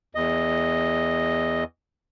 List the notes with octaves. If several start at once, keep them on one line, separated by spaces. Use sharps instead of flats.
E2 D#5